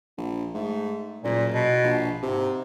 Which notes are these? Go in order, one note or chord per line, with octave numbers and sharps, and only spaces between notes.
A#1
G#2 A3
F#1 A#2
B2
A#1
G#2 C3